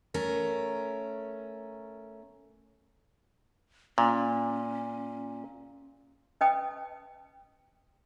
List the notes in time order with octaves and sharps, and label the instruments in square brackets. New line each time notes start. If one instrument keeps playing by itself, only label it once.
[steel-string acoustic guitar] A3 C#4 A#4
[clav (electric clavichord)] A#2 [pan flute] C#4
[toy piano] C#4 B4 D#5 G5 A5 D#6